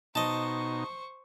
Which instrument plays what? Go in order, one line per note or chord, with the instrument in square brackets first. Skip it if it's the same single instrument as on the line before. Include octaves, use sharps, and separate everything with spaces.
[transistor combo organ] B2 D#4 [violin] C5 C#6 [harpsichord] D#5 A5